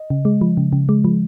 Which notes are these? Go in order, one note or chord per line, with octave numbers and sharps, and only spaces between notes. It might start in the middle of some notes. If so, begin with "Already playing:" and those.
Already playing: D#5
C#3
G#3
F3
C#3
C#3
G#3
F3